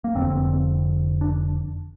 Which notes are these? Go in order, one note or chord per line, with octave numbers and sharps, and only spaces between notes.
A#3
F1 F2 D3 C4
D4